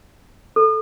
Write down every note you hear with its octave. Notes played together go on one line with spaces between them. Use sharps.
A4